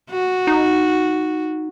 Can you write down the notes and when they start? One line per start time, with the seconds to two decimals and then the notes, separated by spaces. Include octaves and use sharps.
0.11 F#4
0.47 D#4